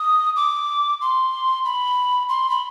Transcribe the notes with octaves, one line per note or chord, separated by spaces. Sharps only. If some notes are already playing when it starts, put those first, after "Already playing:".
Already playing: D#6
D6
C6
B5
C6
B5